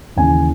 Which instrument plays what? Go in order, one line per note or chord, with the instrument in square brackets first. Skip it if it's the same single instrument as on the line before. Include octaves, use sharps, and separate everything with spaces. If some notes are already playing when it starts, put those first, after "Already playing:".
[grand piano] D#2 C#3 E3 G#5